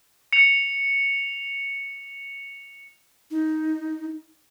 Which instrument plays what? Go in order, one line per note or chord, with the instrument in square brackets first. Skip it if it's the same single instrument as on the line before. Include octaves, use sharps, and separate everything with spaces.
[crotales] C#7 F7
[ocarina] D#4